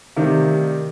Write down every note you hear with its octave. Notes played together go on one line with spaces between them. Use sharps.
C3 D#3 A3 D#4 A#4 D5 F5